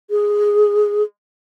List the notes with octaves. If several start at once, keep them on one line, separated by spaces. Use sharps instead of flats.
G#4